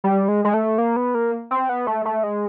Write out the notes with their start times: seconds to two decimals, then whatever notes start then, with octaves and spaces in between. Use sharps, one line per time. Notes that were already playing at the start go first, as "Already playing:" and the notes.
0.04 G3
0.28 G#3
0.45 G#3
0.54 A3
0.78 A#3
0.96 B3
1.15 A#3
1.51 C4
1.69 B3
1.87 A3
2.05 A3
2.23 G#3